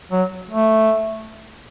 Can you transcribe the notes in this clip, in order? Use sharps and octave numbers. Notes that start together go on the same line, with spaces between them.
F#3
A3